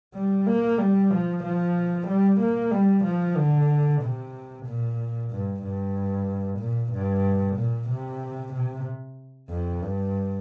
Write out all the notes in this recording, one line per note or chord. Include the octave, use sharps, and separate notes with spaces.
G3
A#3
G3
F3
F3
G3
A#3
G3
F3
D3
C3
A#2
G2
G2
A#2
G2
A#2
C3
C3
F2
G2